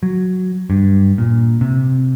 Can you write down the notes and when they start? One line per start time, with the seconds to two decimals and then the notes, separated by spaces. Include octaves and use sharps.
0.03 F#3
0.70 G2
1.18 A#2
1.61 C3